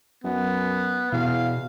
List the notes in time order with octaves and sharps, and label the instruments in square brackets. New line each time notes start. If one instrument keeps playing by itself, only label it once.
[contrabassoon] F#2 [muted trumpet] B3
[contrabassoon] E2 [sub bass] B2 [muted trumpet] F5